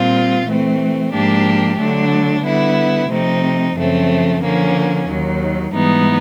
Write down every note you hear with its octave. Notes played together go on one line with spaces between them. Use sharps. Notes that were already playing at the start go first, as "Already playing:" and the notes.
Already playing: A#2 G3 C4 F4
E3 A3 C4
G#2 F3 A#3 D4 G4
D3 F#3 A3 D4
D3 G3 B3 E4
C3 F3 A3 C4 D#4
F#2 C#3 F3 A3 C4
D3 F3 A#3 C#4
D#2 D#3 F#3
G#2 E3 G3 B3 D#4